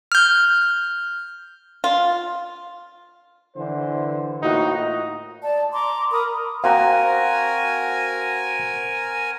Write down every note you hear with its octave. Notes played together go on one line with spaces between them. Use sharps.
F6 G6
F4
D3 E3 C5
A2 A#3 D#4 F4 F#4
D5 A5
A#5 C6 D6
A#4 A#5 B5 D#6
C4 F#4 A#4 F5 G#5 A#5